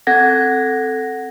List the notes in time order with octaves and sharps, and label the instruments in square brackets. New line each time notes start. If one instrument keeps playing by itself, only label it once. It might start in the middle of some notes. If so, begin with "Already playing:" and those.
[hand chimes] C4 A4 F#5 G#6 A#6